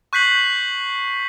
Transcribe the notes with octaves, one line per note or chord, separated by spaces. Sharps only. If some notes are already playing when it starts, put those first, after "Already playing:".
C#6 F#6 G6 B6 C7 F#7